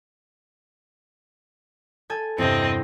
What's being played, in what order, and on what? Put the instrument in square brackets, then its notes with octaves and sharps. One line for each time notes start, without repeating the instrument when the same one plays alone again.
[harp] A4 G#5 G#6
[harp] E2 G2 C3 [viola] C4 D#5